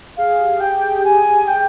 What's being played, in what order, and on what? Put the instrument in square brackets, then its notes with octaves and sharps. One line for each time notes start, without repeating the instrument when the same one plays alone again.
[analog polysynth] G#4 [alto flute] F5
[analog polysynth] G4
[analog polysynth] G4 [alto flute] G5
[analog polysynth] G#4
G4
[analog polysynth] G#4 [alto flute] G#5
[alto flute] G5